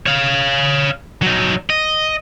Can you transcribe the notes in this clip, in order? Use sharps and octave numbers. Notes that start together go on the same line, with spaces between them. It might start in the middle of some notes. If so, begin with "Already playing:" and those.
C#5 F5
F#3 D#4
D#5